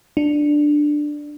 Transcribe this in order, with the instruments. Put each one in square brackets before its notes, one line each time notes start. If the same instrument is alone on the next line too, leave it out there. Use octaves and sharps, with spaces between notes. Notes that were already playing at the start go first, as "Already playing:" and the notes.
[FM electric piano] D4